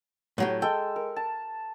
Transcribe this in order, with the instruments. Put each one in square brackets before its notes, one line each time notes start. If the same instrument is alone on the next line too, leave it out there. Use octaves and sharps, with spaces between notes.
[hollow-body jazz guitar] A2 F#3 G4
[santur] G#3 A4 [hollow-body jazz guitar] G5
[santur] A#4
A5